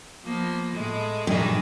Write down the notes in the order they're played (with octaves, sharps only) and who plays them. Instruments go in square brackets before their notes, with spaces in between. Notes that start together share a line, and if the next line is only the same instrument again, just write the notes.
[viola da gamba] F3 A#3 B3
A2 G#3
[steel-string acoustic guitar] G2 A#2 [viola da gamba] D#3 E3 G#4